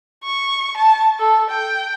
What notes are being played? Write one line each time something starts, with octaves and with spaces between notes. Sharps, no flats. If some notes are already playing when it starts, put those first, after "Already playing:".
C#6
A5
A4
G5